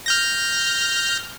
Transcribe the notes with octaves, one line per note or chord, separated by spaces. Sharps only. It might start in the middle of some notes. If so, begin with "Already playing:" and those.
F6 G6 A#6